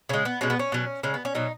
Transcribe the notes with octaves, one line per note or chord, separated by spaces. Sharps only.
C#3 G#3 C#4
B3
B2 G#3 C#4
B3
C#4
B2 F#3
C#3 G#3 C#4
B3
C#4
B2 F#3 D#4